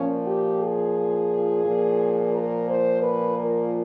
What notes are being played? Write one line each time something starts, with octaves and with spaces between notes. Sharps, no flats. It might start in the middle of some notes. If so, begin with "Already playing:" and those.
Already playing: A#2 F3 C#4
G4
G#4
A#2 F3
A#4
C5
B4
A#4